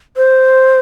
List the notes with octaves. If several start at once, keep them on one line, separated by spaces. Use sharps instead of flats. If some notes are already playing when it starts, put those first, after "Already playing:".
C5